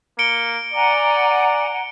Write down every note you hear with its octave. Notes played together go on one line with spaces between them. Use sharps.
A#3 C#7 D7 G7
D5 F#5 G#5 A#5